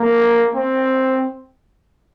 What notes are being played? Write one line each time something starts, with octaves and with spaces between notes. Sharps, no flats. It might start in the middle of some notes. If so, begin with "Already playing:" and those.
Already playing: A#3
C4